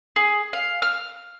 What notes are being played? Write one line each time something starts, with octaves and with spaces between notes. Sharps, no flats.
G#4
F5
F6